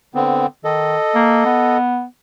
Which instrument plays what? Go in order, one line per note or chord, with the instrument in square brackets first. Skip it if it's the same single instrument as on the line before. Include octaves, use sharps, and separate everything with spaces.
[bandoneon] D3 B3 C4
[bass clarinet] D#3 [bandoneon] A4 D#5
[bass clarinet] A#3
B3